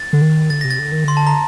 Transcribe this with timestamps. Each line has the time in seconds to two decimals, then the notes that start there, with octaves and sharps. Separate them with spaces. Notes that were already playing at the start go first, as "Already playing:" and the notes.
Already playing: A6
0.13 D3
0.22 D#3
0.50 D3 A6
0.61 C3 A#6
0.71 A6
0.79 D3
0.92 D#3
1.04 D3 C6
1.17 A5
1.27 A#5